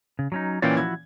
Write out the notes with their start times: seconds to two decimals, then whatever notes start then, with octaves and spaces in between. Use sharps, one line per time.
0.19 C#3
0.32 F#3 C#4 D#4
0.62 A#2 E3 C#4 D5 F5 G5
0.77 F3 E4 F#4 G#6